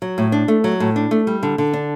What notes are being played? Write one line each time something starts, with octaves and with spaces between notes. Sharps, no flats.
F#3
A2
D4
A3
F#3
A2
D4
A3
G3
D3
D3
D4